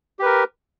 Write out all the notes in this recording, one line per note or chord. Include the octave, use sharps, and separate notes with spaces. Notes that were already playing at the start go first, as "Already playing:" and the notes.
G4 A#4 B4